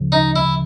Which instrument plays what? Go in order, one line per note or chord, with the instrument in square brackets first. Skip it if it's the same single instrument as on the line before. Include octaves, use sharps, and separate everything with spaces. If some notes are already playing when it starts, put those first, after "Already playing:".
Already playing: [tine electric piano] D2 C#3 F3
[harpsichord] D#4
E4